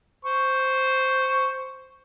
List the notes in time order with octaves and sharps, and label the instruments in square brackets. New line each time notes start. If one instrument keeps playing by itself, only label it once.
[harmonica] C5 C#6